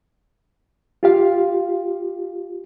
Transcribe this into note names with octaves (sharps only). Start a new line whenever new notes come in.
F4 G4 F5